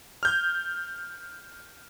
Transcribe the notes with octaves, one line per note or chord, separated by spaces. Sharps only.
F6 G6